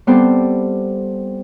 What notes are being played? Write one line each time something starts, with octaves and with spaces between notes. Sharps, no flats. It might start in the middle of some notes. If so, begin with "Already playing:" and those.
G3 B3 C4 A4 C5 D5